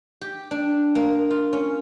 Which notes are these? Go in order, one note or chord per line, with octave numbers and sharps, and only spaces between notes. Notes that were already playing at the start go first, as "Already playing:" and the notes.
G4
D4
A#3
F4
C#4